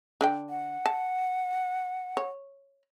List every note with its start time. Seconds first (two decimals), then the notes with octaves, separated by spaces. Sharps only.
0.21 D3 D4 G5
0.50 F#5
0.86 A5
2.17 C#5